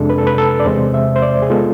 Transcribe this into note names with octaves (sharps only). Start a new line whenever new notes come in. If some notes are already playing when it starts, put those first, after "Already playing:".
Already playing: F2 C3 G#3 D4 A4
B4
A4
B4
A4
D5
E2 C3 G#3 C5
E5
C5
D5
G#4
G#3 B3 F4 A4